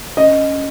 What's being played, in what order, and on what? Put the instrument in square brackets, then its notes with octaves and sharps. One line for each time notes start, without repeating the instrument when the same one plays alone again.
[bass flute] C#4 [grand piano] D#5